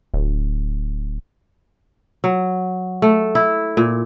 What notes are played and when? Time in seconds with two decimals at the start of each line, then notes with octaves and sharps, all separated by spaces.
0.14 D1
2.24 F#3
3.02 A3
3.35 E4
3.77 A#2